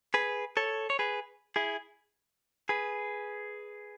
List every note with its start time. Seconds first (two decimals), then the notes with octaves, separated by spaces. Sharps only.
0.14 G#4 B4
0.57 A4 C#5
0.90 C#5
0.99 G#4 B4
1.56 E4 G#4
2.69 G#4 B4